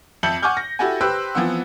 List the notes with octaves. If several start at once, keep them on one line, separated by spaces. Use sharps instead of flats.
F2 E5 A5 G6 C#7 F#7
F#5 G#5 C#6 D6 F6 G6
A#6
E4 F#4 G4 A4 F#5 G#5
G4 B4 C5 G5 E6 F#6
E3 F3 B3 C4 F#5 E6